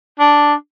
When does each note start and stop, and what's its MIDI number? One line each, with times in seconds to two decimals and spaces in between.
0.20 0.54 62